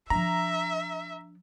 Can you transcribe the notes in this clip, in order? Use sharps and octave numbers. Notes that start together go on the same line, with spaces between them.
F3 D4 E5 A#5